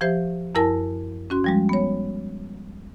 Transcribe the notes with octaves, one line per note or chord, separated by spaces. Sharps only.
F3 G4 C5 E5
F#2 E4 A#4 G#5 A5
C#4 F#4 C6
F3 G3 G#3
B3 C#5